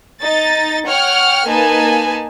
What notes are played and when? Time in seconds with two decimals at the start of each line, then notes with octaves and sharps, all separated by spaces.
0.22 D#4 A6
0.88 C#5 F#5 G5 F6
1.48 A#3 D#4 B4 G#5 A5